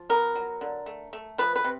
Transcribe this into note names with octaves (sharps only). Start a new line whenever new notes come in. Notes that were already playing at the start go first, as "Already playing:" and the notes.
Already playing: F3
B3 A#4
F#3
D3
A3
A3
F3 B4
B4
C3